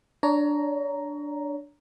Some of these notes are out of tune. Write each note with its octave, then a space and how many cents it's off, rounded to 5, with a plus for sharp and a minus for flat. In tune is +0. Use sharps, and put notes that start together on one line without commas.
D4 +0 C#5 +30 A#5 +0